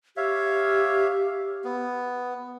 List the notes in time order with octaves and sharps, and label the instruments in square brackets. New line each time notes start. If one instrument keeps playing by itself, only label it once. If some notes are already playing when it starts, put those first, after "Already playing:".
[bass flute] G4 [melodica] C#5 E5 F5
[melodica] B3